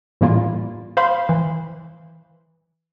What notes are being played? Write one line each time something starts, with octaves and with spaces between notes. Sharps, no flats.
A2 E3 G3 A#3 E4 F4
C5 F5 B5 C6
E3